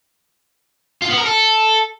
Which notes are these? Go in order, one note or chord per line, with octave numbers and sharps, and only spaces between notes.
F4
B3
A#4
A4